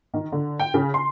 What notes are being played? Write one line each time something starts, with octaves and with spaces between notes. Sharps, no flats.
D#3
D3
G5
C#3
C6